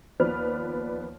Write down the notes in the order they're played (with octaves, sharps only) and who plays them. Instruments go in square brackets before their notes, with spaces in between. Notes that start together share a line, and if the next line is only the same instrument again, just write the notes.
[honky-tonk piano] D#2 F3 B3 B4 D5 F6